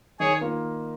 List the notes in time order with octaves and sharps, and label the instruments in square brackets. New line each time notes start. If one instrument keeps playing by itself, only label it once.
[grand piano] D#3 [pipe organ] G#4 C#5
[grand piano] A#3 F4